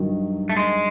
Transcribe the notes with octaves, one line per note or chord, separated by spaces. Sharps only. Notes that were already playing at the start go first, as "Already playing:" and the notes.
Already playing: G2 D#3 F#3
A3
G#3